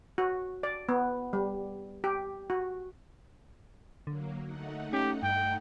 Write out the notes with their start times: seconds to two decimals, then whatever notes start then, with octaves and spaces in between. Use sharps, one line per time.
0.18 F#4
0.63 D5
0.89 B3
1.33 G3
2.04 G4
2.50 F#4
4.07 D3 F#3 A#3
4.43 A3 D#4 F#5
4.93 C#4 G4
5.23 G2 G5